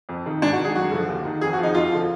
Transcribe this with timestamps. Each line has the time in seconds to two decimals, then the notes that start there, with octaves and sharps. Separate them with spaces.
0.09 F2
0.26 D#3
0.42 G#2 D4
0.53 F#4
0.59 D#3
0.65 G#4
0.75 F#2 F#4
0.91 D3 F3
1.09 D#2
1.25 D#3
1.41 F2 G#4
1.53 F#4
1.58 F3
1.63 D#4
1.74 F2 F4
1.91 D3 F3